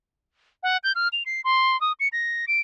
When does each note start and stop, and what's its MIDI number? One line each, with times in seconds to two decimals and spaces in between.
0.63 0.77 78
0.84 0.92 91
0.95 1.08 89
1.13 1.23 101
1.26 1.41 96
1.44 1.79 84
1.81 1.92 87
2.00 2.08 97
2.12 2.45 94
2.48 2.61 98